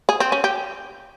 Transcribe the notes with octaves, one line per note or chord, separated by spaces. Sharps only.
G#4
C4
C#4
G4